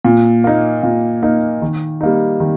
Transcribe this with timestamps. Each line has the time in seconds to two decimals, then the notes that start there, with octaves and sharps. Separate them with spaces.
0.05 A#2
0.44 A#3 D#4
0.83 A#2
1.23 A#3 D#4
1.62 D#3
2.01 G3 A#3 D#4
2.40 D#3